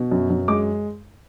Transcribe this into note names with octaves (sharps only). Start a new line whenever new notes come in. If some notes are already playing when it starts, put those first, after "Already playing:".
Already playing: B2
F#2
F#2
G#3 D6